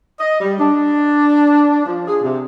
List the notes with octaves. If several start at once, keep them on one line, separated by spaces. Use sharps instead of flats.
D#5
G3
D4
F3
G#4
C3